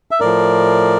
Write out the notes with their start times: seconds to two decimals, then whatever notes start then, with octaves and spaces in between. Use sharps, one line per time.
0.11 E5
0.20 A2 F3 A#4 D5